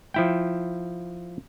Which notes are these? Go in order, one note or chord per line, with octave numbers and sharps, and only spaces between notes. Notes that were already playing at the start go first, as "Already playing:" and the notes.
F3 E4 G5